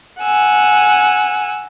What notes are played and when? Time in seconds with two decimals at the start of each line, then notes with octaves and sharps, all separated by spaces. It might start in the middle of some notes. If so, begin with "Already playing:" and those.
0.22 F#5 G#5 E6